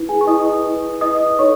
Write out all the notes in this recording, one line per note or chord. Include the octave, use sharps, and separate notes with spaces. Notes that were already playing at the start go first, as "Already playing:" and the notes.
Already playing: E4 B4
G#4 G#5
C#6
E4 B4 D#5 D#6
E4 B4
E4 B4 D#5 D#6
D#4 A4 C#5 C#6